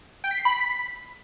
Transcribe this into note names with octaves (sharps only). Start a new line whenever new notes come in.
G5
B6
C7
B5
B6